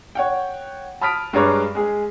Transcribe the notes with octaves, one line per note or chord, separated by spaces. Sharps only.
C#5 F#5 G5
A5 B5 D#6 F6 B6 D7
G2 G#3 B4 C#5 A#5 D6
G#3 G#4